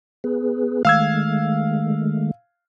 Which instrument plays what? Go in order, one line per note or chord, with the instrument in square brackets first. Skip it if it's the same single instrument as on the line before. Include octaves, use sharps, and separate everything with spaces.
[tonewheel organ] B3 G#4 B4
[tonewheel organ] D#3 G#3 A3 [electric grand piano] F5 E6 G#6